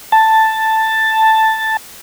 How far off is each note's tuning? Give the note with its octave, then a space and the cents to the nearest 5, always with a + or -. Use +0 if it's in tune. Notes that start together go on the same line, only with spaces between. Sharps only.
A5 +5